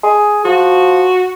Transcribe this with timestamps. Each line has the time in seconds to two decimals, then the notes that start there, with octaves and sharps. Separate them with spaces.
0.04 G#4
0.45 F3 F#4